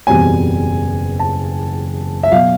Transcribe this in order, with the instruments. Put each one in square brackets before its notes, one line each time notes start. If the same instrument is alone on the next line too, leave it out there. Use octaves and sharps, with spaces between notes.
[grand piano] F#1 E2 B2 G3 C4 G#5
A5
E5
B2 F#3 F5